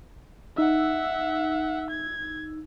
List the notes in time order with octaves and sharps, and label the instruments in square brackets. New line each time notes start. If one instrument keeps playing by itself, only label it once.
[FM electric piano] D#4 E6 [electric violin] E5 F#5
[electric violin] G#6